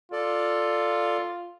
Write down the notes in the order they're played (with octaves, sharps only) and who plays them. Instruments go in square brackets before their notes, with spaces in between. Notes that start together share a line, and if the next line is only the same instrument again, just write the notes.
[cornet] F4 [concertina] A4 D5